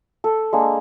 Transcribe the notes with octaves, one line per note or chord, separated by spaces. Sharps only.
A4
G#3 A#3 D4